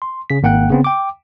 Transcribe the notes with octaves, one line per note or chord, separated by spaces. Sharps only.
C6
C#3 B6
G#1 A#3 F#5 G5 F#6
C#3 B3 C4
G5 D6